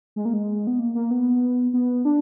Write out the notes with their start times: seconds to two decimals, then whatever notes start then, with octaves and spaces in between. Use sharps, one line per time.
0.16 G#3
0.25 A#3
0.33 G#3
0.67 B3
0.79 A#3
0.95 A#3
1.11 B3
1.73 B3
2.05 D4